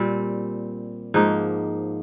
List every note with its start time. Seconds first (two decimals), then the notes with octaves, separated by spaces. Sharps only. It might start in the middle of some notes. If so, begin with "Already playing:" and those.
Already playing: A#2 G3 C4
1.14 G#2 F3 A#3 D#4